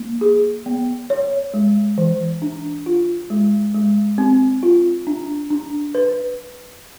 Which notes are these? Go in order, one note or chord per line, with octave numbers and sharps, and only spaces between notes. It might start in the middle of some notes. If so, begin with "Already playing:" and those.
Already playing: A#3
G#4
B3
C#5
G#3
E3
D4
F4
G#3
G#3
C4
F4
D4
D4
B4